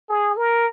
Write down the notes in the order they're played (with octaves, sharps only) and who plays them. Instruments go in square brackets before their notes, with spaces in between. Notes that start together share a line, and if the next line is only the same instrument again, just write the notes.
[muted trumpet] G#4
A#4